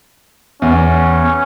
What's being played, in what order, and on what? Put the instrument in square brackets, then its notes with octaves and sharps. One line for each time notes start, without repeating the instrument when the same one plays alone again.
[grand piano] E2 [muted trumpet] C#4